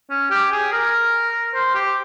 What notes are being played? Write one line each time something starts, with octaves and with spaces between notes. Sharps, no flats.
C#4
G4
G#4
A#4
C5
G4